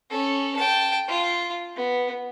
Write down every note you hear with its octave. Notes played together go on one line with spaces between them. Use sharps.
C#4 A4
G5 A5
F4
B3